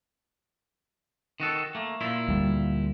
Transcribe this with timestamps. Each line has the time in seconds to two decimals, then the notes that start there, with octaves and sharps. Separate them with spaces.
1.40 D#3 F#4 A4
1.75 A3 A#3
2.01 A#2 E4 F4
2.28 D2 G3